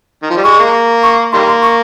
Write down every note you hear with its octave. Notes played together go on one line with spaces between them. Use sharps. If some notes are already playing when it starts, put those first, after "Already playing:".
D#3
F3
G3
G#3 C#6
A#3
C#6
D#3 G3 A#3 C6
C6
C#6